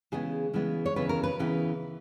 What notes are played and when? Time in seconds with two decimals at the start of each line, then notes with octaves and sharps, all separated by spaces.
0.12 C#3 E3 G#3 B3 G#4
0.53 C#3 E3 G#3 B3
0.86 C#5
0.96 D#2 C#3 E3 B3 B4
1.09 A#4
1.23 B4
1.39 C#3 E3 B3